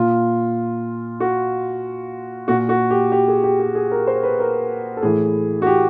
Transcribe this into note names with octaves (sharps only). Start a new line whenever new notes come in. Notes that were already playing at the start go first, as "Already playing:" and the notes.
Already playing: A#2 F4
F#4
A#2 F#4
F#4
G4
G4
G#4
G4
G4
G#4
A#4
C5
B4
A#4
A4
A2 E3 G#4
F#4
G4